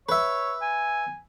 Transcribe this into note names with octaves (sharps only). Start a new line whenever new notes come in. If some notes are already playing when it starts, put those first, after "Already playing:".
B4 C#5 E5
G#5